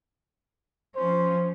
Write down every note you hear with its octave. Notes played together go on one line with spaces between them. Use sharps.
F3 C#4 C5